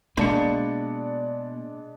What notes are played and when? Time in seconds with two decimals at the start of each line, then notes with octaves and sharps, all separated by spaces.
0.17 B2 G#3 A#3 D4 D5 A5 C#7